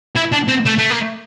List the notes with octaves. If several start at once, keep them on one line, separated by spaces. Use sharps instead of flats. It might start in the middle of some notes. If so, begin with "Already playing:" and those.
E4
D4
C4
A3
A3
A#3